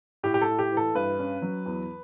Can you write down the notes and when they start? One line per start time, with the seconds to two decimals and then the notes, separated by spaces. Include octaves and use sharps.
0.23 A2 G4
0.34 G4
0.42 A4
0.48 A2
0.59 G4
0.72 E3
0.77 A4
0.95 G2 B4
1.19 C#4
1.42 F#3
1.66 E2